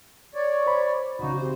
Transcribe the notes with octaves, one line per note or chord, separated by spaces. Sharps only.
C#5 D5
C5 B5
C2 C#3 D#4 F#4
C3 C5